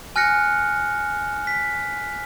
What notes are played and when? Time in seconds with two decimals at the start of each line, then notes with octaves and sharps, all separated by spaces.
0.16 G#5 F6 F#6 A#6 C#7
1.47 B6